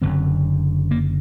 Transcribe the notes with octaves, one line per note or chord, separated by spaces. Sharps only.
F#1 F#2 D3 C4
A#3